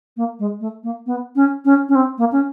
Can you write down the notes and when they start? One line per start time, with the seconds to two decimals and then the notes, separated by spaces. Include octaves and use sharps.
0.16 A#3
0.39 G#3
0.60 A3
0.83 A#3
1.06 B3
1.35 C#4
1.65 C#4
1.88 C#4
1.95 C4
2.18 A#3
2.32 C#4